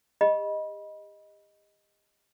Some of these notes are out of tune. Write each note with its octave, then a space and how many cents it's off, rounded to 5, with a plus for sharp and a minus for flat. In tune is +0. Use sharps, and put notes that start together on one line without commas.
G4 +40 D#5 +0 B5 -25